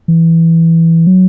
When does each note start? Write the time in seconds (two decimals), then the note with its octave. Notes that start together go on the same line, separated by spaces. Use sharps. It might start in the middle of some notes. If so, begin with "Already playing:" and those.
0.08 E3
1.07 F#3